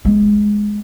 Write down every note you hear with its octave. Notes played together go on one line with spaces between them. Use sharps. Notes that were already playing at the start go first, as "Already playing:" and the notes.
G#3 B3